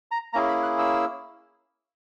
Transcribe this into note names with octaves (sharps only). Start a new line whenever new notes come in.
A#5
A#3 C#4 E4 G#4 A#5
B5
F#6
E6